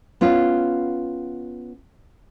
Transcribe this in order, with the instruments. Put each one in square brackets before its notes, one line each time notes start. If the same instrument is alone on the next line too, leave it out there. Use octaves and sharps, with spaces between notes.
[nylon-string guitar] B3 C#4 F4